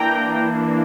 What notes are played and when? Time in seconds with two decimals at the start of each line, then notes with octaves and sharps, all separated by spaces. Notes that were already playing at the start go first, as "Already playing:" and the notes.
Already playing: E3 A#3 D4 G5 A#5